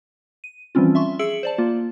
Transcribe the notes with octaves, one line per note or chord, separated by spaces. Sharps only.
D#7
E3 F3 G3 C4 C#4 F4
E5 C6 C#6
G#4 E5 E6 C#7 D7 F#7
C5 D5 A5
A#3 F4